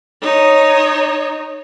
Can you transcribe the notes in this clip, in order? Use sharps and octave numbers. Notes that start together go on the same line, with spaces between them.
D#4 C#5